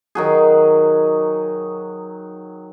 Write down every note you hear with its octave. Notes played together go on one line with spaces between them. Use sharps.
D#3 F#3 G#4